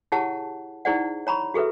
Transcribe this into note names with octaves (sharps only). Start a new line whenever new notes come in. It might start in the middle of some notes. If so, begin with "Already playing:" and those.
E4 G4 G#4 C#5 F#5 A5
D#4 E4 G#4 C5 D5 F#5
C#5 A#5 B5 C#6
F#4 G#4 A4 B4 E5